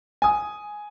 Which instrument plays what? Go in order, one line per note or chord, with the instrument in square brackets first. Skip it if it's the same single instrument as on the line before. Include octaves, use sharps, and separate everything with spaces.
[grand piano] G#5 D#6